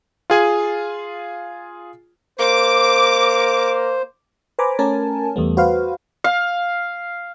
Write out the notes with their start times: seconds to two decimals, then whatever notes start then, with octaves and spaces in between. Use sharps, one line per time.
0.30 F4 G#4 G#5
2.39 A#3 C5 D6
4.59 B4 C5 G#5 A#5 B5 D6
4.79 A3 C#4 A#4 G#5 A5
5.36 E2 G3 A3 B3
5.57 F#4 B4 C5 F5
6.24 F5